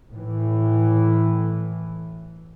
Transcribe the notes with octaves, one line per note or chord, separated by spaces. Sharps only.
A2 E3